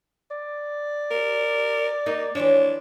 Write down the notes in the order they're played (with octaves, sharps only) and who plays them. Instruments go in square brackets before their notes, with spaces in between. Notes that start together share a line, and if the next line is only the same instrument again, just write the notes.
[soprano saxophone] D5
[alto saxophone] A#4
[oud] A#3 [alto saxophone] D#4
[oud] E3 F3 C#5 [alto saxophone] D4